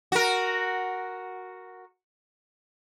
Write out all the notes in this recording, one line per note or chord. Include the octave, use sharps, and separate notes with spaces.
F#4 A#4